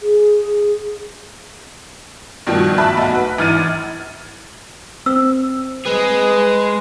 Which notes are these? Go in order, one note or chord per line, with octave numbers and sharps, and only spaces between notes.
G#4
G2 B2 D#3 F3
E5 A5 B5 F#6
B1 F#4
B4
G#1 E3 F6 G#6 A6 D#7
C4 E6
G#3 G#4 B4